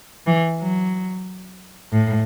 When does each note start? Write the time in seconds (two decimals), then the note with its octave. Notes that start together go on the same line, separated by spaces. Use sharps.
0.27 E3
0.61 F#3
1.92 A2